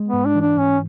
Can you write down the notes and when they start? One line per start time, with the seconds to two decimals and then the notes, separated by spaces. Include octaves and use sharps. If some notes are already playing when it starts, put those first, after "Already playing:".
Already playing: G#3
0.08 B3
0.13 G#2
0.25 D4
0.35 E3
0.41 D4
0.57 G#2 C#4